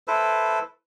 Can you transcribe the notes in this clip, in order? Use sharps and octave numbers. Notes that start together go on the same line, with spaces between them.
E4 A4 B4 C5